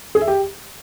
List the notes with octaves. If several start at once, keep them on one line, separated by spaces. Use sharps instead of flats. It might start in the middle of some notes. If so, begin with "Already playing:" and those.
G#4
E5
G4